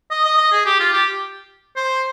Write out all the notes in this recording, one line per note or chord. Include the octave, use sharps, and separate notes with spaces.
D#5
D#5
D#5
G#4
G4
F4
G4
C5